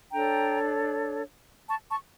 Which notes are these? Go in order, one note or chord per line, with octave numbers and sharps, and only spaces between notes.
D4 A4 C#5 G5 A#5
A5 C#6
A5 C#6